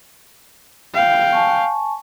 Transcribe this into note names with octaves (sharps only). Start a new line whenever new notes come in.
F5 G5
G#5 A5 C#6